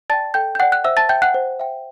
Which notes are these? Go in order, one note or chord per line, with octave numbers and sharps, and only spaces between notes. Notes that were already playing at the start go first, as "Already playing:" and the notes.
D5 G5 A5 A6
A4 G5 G6
G6
D5 F#5 G5 F#6
F#6
C5 E5 E6
A5 A6
E5 G5 G6
F#5 F#6
C5
E5 G5